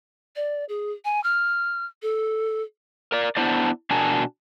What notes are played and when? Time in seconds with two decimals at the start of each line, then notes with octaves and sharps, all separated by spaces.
0.36 D5
0.69 G#4
1.05 G#5
1.24 F6
2.02 A4
3.12 A#4 D5
3.37 B3 D4 E4 C5 D5
3.91 B2 D4 F#4 A#4 G#5 A5